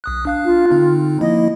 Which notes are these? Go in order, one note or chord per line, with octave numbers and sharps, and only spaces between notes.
B1 D#6 F#6
D4 F5 F#6
F4
D3 C4 D#4
F3 A#3 E4 D#5